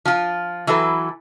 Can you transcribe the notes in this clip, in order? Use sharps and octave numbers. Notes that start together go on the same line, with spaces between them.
F3 F4
E3 F#3 E4 A4 B4